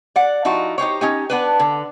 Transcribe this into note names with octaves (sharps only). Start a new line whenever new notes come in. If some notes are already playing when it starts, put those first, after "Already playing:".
D5 F#5
F3 D#4 E4 F#4
D#4 G4 C5 C#5
C#4 D#4 G4
B3 D4 B4
D3